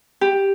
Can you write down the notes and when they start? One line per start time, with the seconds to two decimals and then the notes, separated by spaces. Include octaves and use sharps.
0.21 G4